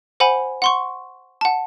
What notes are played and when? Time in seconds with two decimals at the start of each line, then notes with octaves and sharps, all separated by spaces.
0.20 C5 F#5 G#5 B5
0.62 F#5 C6 C#6
1.41 F#5 A5